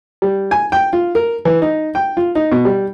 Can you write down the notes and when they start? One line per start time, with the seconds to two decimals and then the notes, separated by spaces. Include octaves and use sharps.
0.22 G3
0.51 G#5
0.72 G5
0.93 F4
1.15 A#4
1.45 E3
1.62 D#4
1.95 G5
2.17 F4
2.35 D#4
2.52 B2
2.65 G3